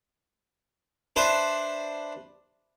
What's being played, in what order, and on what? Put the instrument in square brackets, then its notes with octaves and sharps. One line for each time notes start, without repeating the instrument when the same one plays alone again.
[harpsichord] D4 B4 C5 E5